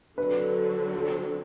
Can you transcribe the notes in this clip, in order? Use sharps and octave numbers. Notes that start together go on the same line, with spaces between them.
D3 F#3 C4 B4
A4